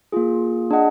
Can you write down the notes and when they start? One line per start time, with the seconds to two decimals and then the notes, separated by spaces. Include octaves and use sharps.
0.12 A#3 F4 G#4
0.71 D4 G#4 D#5 F#5